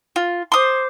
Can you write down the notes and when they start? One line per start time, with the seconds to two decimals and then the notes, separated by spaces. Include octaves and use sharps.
0.16 F4
0.52 C5 C6 D6 D#6